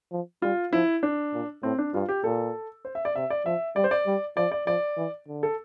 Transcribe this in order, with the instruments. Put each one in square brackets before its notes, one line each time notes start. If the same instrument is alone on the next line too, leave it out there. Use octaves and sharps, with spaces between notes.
[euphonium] F3
[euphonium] G3 [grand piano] F4
[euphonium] F3 [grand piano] E4
[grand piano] D4
[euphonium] A#2
[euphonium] A2 [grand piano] C4
[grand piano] D4
[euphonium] G2 [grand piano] F4
[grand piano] G4
[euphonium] A#2 [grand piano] A4
[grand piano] C5
E5
D5
[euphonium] C3 [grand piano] E5
[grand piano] D5
[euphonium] F3 [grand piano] E5
[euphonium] G3 [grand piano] D5
[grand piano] C5
D5
[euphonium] G3
[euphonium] F3 [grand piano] D5
[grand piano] D5
[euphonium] F3 [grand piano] D5
[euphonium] E3
D3
[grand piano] A4